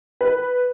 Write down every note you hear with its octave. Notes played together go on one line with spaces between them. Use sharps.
B4